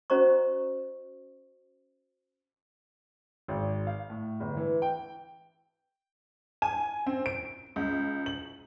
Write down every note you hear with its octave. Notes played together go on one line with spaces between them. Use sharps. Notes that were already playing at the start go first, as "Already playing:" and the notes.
C#4 F#4 C5 D#5 A#5 C#6
G#1
F5
A2
G1
E3
G5
G#5
C4
D7
C#2
F#7